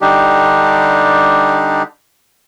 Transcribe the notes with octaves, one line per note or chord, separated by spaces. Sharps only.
D3 G3 D4 D#4 G4